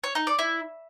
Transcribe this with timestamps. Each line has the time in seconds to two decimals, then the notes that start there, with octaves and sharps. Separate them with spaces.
0.04 C#5
0.15 D#4
0.27 D5
0.39 E4